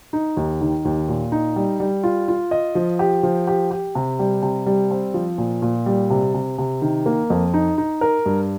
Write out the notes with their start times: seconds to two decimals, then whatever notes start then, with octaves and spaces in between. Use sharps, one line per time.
0.13 D#4
0.37 D#2
0.61 D#3
0.85 D#2
1.09 A#2
1.32 D#4
1.56 G3
1.80 G3
2.04 F4
2.28 F4
2.51 D#5
2.75 F3
2.99 G4
3.23 F3
3.47 G4
3.71 G4
3.95 C3
4.19 G3
4.42 C3
4.66 G3
4.91 C4
5.14 F3
5.38 A#2
5.62 A#2
5.86 G3
6.10 C3
6.34 C3
6.58 C3
6.82 D#3
7.06 A#3
7.30 F2
7.54 D#4
7.78 D#4
8.01 A#4
8.26 G2